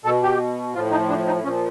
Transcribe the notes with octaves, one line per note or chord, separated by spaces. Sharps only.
B2 A4
G4
A2 F3 F4
D#4
D4
D#4
A#2 F3 C#4